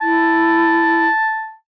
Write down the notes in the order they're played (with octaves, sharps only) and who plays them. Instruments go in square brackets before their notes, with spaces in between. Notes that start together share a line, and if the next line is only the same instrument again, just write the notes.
[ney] E4 [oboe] A5